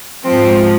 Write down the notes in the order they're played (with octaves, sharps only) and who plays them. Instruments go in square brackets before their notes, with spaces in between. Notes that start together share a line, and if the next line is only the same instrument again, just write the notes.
[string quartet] G#2 F3 C4